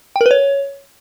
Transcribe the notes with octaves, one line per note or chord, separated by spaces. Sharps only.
G5
A#4
B4
C#5